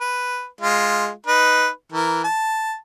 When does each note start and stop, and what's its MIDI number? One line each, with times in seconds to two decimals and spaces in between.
0.01 0.46 71
0.61 1.10 56
0.61 1.10 65
1.26 1.69 63
1.26 1.69 71
1.92 2.23 52
1.92 2.23 70
2.24 2.76 81